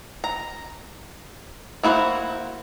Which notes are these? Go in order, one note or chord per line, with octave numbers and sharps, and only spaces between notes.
A#5
A#3 E4 F#4 A4 C5